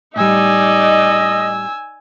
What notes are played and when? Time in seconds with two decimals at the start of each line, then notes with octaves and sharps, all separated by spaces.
0.16 A2 G3 D#4 D5 D#5 G#5 E6